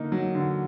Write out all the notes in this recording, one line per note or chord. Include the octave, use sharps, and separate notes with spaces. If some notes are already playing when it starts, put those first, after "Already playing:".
Already playing: D3 A#3 D#4
F#3
D3